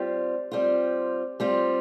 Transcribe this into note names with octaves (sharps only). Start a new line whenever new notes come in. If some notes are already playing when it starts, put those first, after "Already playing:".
Already playing: G3 C4 F4
G3 C4 F4
G3 C4 F4